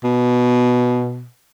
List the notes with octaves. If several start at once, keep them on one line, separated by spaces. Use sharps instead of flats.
B2